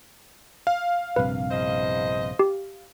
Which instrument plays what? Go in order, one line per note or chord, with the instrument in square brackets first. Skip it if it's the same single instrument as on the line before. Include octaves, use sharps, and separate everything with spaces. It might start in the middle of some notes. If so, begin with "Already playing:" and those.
[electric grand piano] F5
[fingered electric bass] A#1 G2 C3 [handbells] B4
[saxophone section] E2 C5 D#5
[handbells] G4